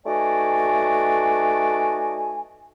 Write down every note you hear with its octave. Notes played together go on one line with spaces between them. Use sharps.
A3 D#4 F#4 B4 D5 G#5